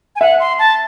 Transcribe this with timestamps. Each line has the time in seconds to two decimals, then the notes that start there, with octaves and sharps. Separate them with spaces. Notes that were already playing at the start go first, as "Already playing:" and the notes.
0.16 G#5
0.21 E5 F#5
0.40 C6
0.59 A5